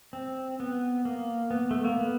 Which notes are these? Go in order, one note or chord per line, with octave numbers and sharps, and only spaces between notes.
C4
B3
A#3
B3
A3
A#3
B3